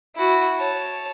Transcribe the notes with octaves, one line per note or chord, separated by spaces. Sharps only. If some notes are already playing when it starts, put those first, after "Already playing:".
E4 F#4
C#5 A5